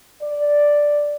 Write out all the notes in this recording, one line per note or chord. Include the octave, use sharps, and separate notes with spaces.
D5